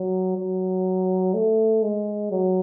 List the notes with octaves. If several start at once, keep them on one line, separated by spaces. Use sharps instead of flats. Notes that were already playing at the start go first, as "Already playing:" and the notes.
Already playing: F#3
F#3
A3
G#3
F#3